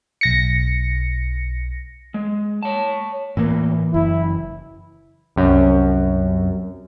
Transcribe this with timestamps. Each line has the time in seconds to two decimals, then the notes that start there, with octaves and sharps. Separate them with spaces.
0.21 B1 A#6 C#7
2.14 G#3
2.63 C#5 A5
3.37 A2 E3 A#3
3.94 F#1 E4
5.36 C2 F#2